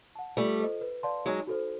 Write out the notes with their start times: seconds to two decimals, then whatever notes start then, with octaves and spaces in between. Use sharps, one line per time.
0.15 F#5 A5
0.37 G3 A3 F4
0.59 A4 C5 D#5
0.81 B4
1.03 D5 F5 A5 C6
1.25 F#3 G#3 D#4
1.47 F#4 A4 C5